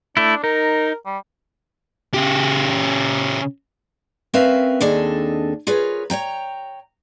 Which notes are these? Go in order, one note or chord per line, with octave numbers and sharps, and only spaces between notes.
A3 D4 E4
D#4 A#4
G3
C#3 G4
C4 C#4 A#4 B4 E5 F5
D#2 C4 D4 G#4 A4 D#5
F4 G#4 A#4 B4 C#5
C#5 D5 G5 A#5